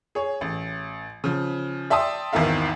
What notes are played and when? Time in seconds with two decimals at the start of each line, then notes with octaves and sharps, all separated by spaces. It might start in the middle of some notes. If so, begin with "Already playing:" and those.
0.15 G#4 C#5
0.41 A1
1.24 C#3 F3
1.90 D5 E5 G5 A5 C6 D#6
2.33 G#1 E2 D#3 A#4 E5 F5